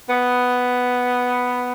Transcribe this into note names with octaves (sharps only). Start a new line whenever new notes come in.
B3